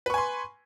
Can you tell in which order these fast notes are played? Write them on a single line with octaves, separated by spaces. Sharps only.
B4 C#6 G#5 C6